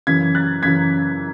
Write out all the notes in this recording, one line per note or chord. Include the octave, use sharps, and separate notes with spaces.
F#2 C#3 E3 G#6 B6
F#6 A6
F#2 C#3 E3 G#6 B6